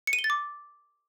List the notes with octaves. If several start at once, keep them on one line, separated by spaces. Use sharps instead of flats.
C#7
D#7
G7
A6
D6